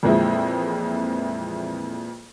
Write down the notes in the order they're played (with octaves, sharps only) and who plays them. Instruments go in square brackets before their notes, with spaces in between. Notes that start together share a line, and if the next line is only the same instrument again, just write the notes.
[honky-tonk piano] F2 A#2 E3 G#3 C4 E4